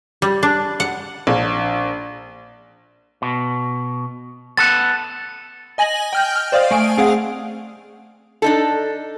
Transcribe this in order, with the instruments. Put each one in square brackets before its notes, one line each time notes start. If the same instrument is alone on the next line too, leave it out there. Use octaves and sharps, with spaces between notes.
[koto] G3
D4
F#5
[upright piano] A#1
[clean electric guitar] B2
[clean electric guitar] B3 A4 [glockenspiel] F#6 A6
[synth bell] D#5 G#5 A#6 F#7
G5 F6 G6
F6
C5 D5 D#5 F5 D#6
A3 G#5 D7
C4 G#4 F5 F#5
[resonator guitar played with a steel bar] D4 D#4 A4